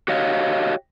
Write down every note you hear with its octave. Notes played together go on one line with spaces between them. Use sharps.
F#4 G4 C#5 D#5 F5